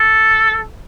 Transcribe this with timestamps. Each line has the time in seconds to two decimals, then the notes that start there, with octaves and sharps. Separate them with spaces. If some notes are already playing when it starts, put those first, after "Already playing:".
Already playing: A4